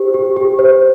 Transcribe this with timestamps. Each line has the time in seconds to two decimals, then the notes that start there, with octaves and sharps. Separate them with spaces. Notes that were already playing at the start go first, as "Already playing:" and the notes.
Already playing: G4 C5
0.14 G4
0.36 G4
0.59 C5